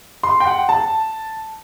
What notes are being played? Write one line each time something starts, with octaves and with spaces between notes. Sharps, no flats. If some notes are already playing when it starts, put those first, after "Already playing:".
C6
G5
F#5
A5